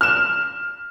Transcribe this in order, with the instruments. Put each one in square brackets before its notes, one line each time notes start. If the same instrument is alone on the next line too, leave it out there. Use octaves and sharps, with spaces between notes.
[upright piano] F6 E7